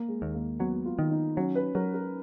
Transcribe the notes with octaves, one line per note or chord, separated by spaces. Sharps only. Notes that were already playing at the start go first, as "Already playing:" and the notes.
Already playing: A#3
G#3
D#2
A#3
F#3 B3
F4
D#3
D#4
F#3 C#4
B4
F#3 A#4
A#4